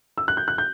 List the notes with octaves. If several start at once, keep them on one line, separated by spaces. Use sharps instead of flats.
E6
F#6
G6
F#6
G6